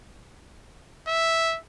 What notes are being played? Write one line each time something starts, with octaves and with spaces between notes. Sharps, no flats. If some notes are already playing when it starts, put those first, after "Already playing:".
E5